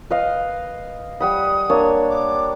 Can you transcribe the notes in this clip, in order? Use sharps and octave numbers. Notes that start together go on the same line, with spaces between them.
B4 D#5 F5
G3 F#5 B5 D#6
A#3 D4 C#5
D6